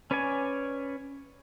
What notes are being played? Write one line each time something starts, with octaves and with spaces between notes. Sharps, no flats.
C#4 B4 C#5 D5 G#5